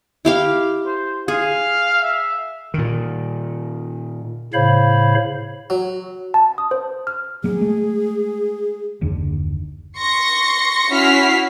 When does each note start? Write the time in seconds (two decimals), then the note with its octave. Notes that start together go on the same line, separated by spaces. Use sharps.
0.25 E4 G4 F5
0.86 C5
1.28 G#4 F5
2.03 E5
2.74 A#2 D#3
4.54 A2 C#3 C5 C#5 F5 B5
5.70 F#3
6.34 A5
6.58 D#6
6.71 C5
7.07 F6
7.44 F#3 A#3 G#4
7.61 G#3 A3
9.01 F#1 D#2 D3
9.98 C6 C#6 A#6 C#7
10.90 C#4 E4 F#4 F6 B6 C7